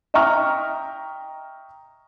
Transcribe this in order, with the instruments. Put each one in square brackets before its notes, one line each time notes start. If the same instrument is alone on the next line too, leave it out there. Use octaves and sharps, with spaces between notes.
[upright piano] D#5 E5 G5 A#5 C#6 F6